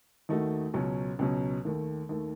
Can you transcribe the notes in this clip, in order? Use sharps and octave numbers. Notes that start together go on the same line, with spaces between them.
D#2 D#3 A3 D#4 F#4
C#2 B2 F#3 C#4
C#2 B2 F#3 C#4
D#2 D#3 A3
D#2 D#3 A3